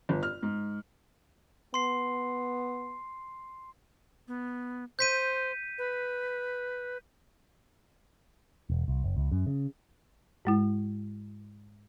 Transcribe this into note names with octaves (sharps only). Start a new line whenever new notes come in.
G1
F6
G#2
B3 C6 C7
B3
C5 G6 B6 D#7
B4
E1
C2
F#1
C#2
F#2
C#3
G#2 G#3 E4